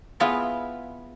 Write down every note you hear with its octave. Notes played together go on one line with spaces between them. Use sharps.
B3 E4 F4 G#4 B4